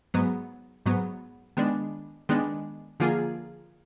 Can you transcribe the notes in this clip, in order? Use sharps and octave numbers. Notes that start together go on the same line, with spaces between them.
G#2 F#3 B3
G#2 F#3 B3
D#3 G#3 B3 D4
D#3 G#3 B3 D4
D3 F3 A#3 F4 G#4